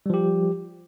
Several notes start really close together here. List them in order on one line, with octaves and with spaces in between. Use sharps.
G3 F3 G4